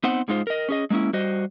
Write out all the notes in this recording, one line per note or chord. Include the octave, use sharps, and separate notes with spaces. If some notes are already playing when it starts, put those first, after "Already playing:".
B3 C4 D#4 C5 F#5
G#2 G#3 D#4 F4 C5
A#4 D#5
C#4 G#4 D#5
G#3 A#3 C4 C#4 E4
G3 F#4 C5 D#5